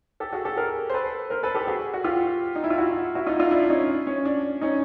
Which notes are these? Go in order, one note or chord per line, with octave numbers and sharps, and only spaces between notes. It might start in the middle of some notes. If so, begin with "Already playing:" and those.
G4 A4
F#4 G#4
G4 A4
G#4 A#4
C5
A4 B4
A#4 C5
A4 B4
G4 A4
F#4 G#4
F#4
F4 G4
D#4
E4
F4
E4 F#4
E4 F#4
D#4 F4
D#4 F4
D4 E4
C#4 D#4
C#4
D4
C#4 D#4